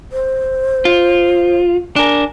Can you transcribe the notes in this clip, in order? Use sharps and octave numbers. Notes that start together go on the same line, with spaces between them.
C5
F4
D4 A#4 G#5